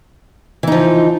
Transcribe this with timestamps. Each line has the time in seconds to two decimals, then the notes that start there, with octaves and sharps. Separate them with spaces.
0.63 E3
0.67 D#4
0.72 F3